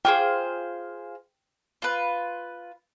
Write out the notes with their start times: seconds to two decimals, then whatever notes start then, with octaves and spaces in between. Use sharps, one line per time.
0.05 F4 G#4 C5 G5
1.82 F4 B4